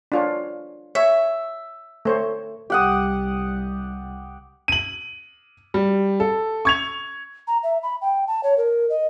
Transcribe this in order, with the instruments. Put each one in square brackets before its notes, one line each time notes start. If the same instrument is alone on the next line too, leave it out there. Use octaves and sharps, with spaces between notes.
[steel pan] D4 F4 C#5
[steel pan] C#5 [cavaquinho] E5
[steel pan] A3 C5 C#5
[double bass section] C2 G3 [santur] G4 F#5 D#6
[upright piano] D#7 F#7
G3
A4
C#6 G#6 F7
[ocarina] A#5
E5
B5
G5
A5
C#5
A#4
D#5